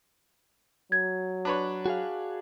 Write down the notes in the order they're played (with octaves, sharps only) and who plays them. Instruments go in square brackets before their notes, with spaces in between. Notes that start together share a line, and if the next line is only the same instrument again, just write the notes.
[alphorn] F#3 [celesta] G#6
[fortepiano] D4 B4 C#5
[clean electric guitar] F#4 G#4 F5